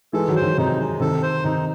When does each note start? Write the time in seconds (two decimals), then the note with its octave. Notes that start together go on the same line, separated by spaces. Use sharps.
0.13 E3 G#3 A4
0.28 D#3 F#3
0.36 C5
0.42 D#3 F#3
0.57 C3 D#4
0.79 G#3
1.00 C3 D#3 A4
1.22 C5
1.44 C3 D#3 D#4